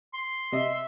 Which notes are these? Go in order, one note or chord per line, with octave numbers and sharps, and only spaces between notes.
C6
C3 D#5 E5